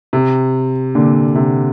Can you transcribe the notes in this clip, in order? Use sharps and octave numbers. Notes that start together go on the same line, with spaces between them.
C3
A#2 D3
C3